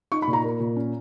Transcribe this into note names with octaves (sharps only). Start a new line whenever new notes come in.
D#4 C#6
B5
A#2
A#5
A#3
A#2
C#4